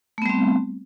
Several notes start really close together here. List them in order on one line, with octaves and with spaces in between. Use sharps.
A3 B3 G3 C4